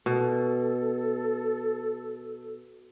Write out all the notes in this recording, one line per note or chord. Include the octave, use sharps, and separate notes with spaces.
B2 A4